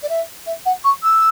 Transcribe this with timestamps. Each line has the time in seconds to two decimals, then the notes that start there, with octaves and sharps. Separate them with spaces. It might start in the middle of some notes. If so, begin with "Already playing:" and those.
0.02 D5
0.09 E5
0.46 E5
0.65 F#5
0.84 C#6
1.03 E6